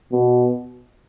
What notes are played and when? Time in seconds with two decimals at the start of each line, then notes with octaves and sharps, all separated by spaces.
0.13 B2